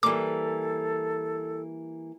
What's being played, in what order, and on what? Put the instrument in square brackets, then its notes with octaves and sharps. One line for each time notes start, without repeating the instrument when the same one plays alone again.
[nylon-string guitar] E3 G3 A#3 [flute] A4 [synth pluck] D6